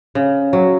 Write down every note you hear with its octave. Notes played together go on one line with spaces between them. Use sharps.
C#3
F#3